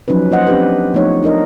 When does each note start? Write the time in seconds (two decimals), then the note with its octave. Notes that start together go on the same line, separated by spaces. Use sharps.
0.08 F3 F#3 C#4 D#4 B4
0.31 A#3 C5 D#5 F#5
0.47 C4 D4 G4 B4
0.94 F3 A3 B3 D#4 C#5
1.23 D4 D#4 A#4 D#5